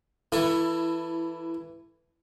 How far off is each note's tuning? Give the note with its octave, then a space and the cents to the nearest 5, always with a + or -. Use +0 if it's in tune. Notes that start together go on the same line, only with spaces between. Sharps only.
E3 +0 E4 +15 A4 +20